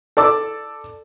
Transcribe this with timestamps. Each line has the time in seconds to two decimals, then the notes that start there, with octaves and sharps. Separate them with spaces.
0.17 A4 D5 D6 E6